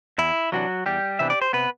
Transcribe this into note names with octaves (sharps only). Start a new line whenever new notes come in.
E2 E4
C3 E3 F#3 B3 D4 F#4
E2 G3 G4
C3 E3 B3 D4 E5
D5
C5
C3 B3 B4